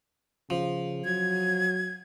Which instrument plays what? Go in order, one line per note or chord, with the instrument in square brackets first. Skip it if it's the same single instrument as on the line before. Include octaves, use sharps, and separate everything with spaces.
[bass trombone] C#3 [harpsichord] F3
[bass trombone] F#3 [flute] G#6